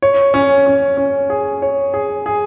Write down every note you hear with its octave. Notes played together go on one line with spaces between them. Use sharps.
C#5
C#4
C#4
C#4
G#4
C#5
G#4
G#4